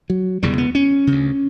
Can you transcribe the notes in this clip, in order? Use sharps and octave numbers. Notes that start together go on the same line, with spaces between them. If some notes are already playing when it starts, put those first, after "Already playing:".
F#3
E1 E2 C#3 G3
B3
C#4
D2 C#3